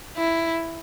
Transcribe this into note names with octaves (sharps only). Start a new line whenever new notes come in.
E4